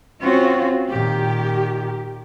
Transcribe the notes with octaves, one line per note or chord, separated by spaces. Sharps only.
C4 C#4 F4 F#4
A#2 D#3 G4